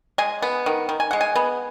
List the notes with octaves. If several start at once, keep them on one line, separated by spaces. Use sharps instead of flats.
G#3 G#5
B3
D#3
D#3
G#5
G#3 F#5
G#5
B3